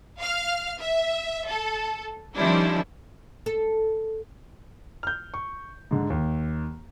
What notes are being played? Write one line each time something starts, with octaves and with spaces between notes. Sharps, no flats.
F5 F6
E5
A4
D#3 F3 G3 C#4 D4 E4
A4
F6 G6
C#6
G#2 D3
D#2